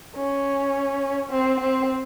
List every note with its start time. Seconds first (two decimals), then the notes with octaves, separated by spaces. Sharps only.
0.15 C#4
1.31 C4
1.60 C4